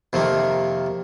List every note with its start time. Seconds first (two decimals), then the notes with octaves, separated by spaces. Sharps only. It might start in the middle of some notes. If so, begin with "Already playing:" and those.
0.13 F2 C3 D#3 F3 A#3